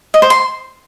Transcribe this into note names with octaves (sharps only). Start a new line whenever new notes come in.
D#5
C5
C6